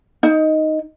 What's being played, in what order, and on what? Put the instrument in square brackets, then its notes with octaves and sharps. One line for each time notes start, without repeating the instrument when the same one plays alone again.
[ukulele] D#4